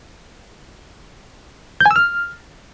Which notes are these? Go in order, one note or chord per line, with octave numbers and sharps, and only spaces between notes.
G6
G#5
E6
F6